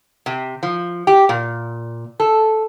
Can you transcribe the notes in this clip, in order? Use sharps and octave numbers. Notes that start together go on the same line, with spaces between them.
C3
F3
G4
A#2
A4